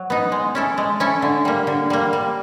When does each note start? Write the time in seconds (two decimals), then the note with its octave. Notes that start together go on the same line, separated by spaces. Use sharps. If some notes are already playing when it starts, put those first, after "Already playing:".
Already playing: F#3
0.10 B3 D#4
0.32 G#3
0.55 C#4 E4 A4
0.78 G#3
1.00 C#4 E4 A4
1.22 D3
1.45 G3 A#3
1.67 D3
1.90 G3 A#3
2.13 G3